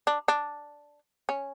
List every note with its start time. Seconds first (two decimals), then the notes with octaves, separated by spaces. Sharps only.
0.07 D4
0.28 D4
1.29 C#4